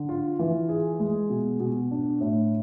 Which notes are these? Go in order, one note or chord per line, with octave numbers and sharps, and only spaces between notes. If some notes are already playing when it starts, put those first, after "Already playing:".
Already playing: D3
F4
E3
G#4
G#3
B2
B2
D4
A2